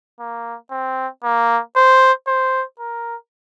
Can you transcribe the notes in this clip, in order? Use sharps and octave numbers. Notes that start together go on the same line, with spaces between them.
A#3
C4
A#3
C5
C5
A#4